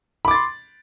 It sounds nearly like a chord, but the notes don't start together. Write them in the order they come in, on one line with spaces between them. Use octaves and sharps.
B5 D6 A6 C6